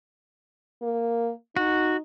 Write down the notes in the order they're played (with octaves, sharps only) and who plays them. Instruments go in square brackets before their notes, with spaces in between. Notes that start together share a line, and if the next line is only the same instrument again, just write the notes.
[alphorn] A#3
[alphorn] D#4 [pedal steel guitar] F#4